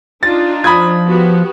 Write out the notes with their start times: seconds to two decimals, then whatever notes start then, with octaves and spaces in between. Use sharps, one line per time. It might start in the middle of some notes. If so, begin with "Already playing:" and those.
0.23 D4 D#4 F4 A6
0.64 F3 B5 D#6 G#6
1.06 B3 F#4 G4